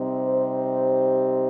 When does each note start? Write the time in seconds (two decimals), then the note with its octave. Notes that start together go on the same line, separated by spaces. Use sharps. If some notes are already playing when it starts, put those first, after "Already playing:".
Already playing: C3 G3 C4 D#4
0.27 C5
0.61 C5